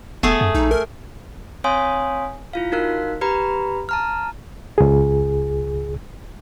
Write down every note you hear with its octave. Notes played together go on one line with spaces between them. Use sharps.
E1 A3 B3 G#4
F#2
A#1 D#4
A#4
C4 C#5 F5 G#5 C6 D#6
E4 F4 F5
D#4 F#4 A#4 F5 F#6
G4 B4 A#5 B5
A5 A#5 F6
C#2 G#4